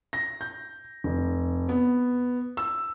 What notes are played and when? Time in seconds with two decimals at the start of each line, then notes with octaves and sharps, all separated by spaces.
0.13 A#6
0.41 G6
1.04 F1
1.69 B3
2.57 E6